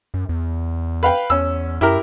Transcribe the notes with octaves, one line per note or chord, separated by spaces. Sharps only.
F#2
E2
B4 F5 G5
E2 C#4 E6
F#2 E4 G4 A#4